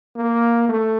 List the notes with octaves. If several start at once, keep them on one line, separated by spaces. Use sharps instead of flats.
A#3
A3